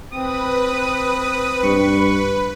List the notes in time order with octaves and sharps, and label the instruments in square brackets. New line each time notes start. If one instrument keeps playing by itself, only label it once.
[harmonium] C4 [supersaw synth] B4 [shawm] D#6
[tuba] G2 [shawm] C#6